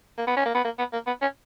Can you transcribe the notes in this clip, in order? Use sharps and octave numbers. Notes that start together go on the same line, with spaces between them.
A#3
B3
C#4
A#3
B3
A#3
B3
A#3
B3
C#4